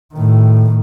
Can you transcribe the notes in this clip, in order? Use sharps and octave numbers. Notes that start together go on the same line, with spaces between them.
A2 D#3